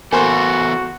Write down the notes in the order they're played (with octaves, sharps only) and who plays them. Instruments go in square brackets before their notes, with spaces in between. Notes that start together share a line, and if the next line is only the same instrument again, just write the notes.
[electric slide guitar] E3 B3 A4 [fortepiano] A#3 C5 [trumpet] F#4 [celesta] G#5